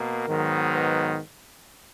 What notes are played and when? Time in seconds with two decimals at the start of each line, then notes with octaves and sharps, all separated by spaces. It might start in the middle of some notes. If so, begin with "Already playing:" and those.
Already playing: B2 A#3 A#4
0.28 G#2 D#3 F#3 B3
0.73 B4